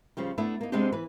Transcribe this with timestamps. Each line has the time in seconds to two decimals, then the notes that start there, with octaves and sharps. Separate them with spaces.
0.17 C#3 F3 G3
0.38 A3 B3 D4 E4
0.61 A#3 D#4
0.72 C3 G#3 B3 C4 D4 G4
0.92 E3 B4